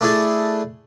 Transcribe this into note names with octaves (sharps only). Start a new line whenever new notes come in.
A3 D4 E4 G#4 A4